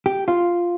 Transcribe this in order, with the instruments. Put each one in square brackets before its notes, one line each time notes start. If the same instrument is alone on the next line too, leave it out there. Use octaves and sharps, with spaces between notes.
[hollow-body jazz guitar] G4
F4